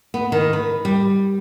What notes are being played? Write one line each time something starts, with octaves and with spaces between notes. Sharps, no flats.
B3
D#3
B4
G3